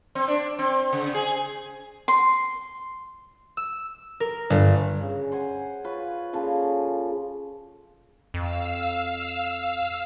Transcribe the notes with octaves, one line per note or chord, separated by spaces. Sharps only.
C4
D4
C4
C#3
G#4
C6
E6
A#4
G1
C#3
C5 F#5 G#5
F4 B4 C#5
A#2 C#3 F3 A4
F2 F5 E6